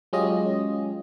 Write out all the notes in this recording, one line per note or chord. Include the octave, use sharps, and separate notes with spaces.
F#3 G#3 C#4 F4 G4 D#5